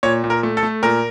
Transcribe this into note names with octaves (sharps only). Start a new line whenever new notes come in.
A#2 C#5
A#2
A#4
A3
A4
A3
A#2 A#4